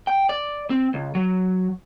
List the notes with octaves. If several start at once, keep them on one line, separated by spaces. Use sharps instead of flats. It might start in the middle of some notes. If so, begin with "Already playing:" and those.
G5
D5
C4
C#2
F#3